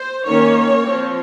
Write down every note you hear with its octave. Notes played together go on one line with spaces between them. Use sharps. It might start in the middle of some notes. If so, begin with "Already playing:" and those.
Already playing: C5
D#3 A#3 C#4 C#5
F3 C4